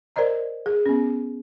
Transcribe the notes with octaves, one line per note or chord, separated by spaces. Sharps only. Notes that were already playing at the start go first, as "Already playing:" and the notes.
A#4 C5 D5 D#5 A#5
G#4
B3 C#4